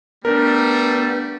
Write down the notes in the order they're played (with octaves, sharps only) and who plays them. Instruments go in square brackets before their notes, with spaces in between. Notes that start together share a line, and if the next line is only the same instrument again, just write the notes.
[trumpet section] G3 A3 [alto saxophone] B3 [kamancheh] D4 [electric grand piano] A#4